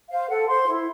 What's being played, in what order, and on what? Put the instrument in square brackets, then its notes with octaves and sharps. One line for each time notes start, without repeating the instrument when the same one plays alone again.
[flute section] C5 F5
A4 F#5
C5 C6
E4